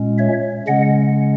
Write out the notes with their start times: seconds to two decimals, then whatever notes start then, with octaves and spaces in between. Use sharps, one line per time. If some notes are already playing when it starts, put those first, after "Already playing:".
Already playing: A#2 G#3 C#4
0.18 C#5 E5
0.67 C#3 G#3 C#4 D#5 F#5